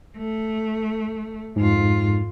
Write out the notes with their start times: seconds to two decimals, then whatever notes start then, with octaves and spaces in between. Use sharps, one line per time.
0.17 A3
1.56 F2 G#2 F4